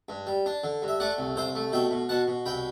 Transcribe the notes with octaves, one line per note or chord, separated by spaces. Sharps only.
G2
G3
D4
D3
G2
E5
A3 D5 F#5
C2
C2 C5 E5
A3
B2 E5 G5
B2
B2 F#5 A5
B2
C2 G5 B5